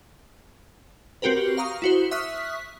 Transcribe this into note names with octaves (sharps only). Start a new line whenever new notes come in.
C4 F#4 G4 A#4 B4
F5 A#5 C#6 D#6
E4 F#4 C5
E5 C#6 D#6 F6 F#6 B6